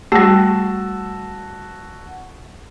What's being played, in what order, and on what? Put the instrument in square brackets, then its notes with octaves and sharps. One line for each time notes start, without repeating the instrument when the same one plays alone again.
[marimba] G3 A3 [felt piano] F#4 A5 E6